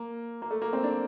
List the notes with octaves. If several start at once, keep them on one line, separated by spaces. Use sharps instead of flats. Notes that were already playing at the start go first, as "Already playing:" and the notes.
Already playing: A#3
A#3
A3
A#3
C4
D4